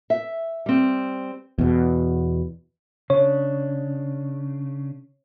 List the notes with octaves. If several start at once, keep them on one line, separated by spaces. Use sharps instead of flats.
E5
G3 C4
E2 B2
C#3 D4 C#5